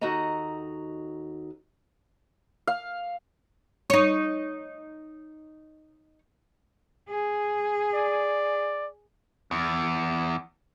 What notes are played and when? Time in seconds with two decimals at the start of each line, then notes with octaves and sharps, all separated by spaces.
0.01 D#2 D#4 F#4 A4 D#5 A#5
2.67 F5
3.90 D#4 C#5
7.09 G#4
7.94 D5
9.51 E2